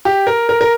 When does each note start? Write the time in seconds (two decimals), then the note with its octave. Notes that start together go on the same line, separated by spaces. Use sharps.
0.05 G4
0.27 A#4
0.49 A#4
0.61 A#4